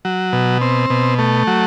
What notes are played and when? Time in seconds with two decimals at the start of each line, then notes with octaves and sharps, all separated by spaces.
0.05 F#3
0.33 B2
0.61 C4
0.90 B2
1.19 A3
1.47 F#3